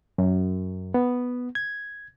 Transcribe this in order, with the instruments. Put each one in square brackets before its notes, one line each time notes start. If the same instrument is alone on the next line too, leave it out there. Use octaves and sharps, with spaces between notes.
[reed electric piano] F#2
B3
G#6